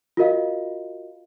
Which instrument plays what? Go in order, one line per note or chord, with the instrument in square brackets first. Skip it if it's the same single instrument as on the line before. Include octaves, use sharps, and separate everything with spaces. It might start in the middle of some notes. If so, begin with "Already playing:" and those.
[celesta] F4 F#4 A#4 D#5 F5